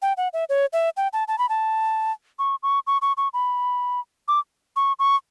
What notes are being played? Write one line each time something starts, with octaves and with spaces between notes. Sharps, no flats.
G5
F#5
E5
C#5
E5
G5
A5
A5
B5
A5
C#6
C#6
C#6
C#6
C#6
B5
D6
C#6
C#6